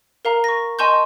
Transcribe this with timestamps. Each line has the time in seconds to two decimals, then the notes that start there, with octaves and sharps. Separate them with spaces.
0.25 A#4 F5 A#5
0.44 C#6 A#6
0.79 D#5 G#5 A5 C6 C#6 G6